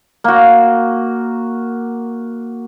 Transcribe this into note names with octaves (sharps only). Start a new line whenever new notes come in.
A#3 F#4